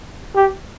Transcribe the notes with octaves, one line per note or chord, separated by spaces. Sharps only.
G4